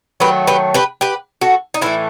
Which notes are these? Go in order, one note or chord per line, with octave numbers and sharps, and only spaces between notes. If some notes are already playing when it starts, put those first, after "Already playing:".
D#3 F#3 A3 G4 B4
G4 B4
G4 B4
G4 B4
F#4 A4
D#4
A2 E3 A3 C4 E4